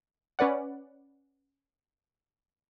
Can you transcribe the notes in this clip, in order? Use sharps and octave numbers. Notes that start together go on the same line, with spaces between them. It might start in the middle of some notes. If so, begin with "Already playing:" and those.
C#4 B4 D5 F#5